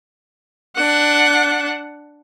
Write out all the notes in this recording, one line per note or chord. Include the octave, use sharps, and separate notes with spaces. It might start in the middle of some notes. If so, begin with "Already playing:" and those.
D4 F#5